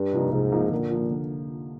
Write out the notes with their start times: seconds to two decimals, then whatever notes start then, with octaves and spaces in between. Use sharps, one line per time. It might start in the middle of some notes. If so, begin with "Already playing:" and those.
Already playing: G2
0.13 C3 F3 A#3 D#4
0.32 C2 G#2
0.52 C3 F3 A#3 D#4
0.72 A#2 D3
0.91 F3 A#3
1.10 D3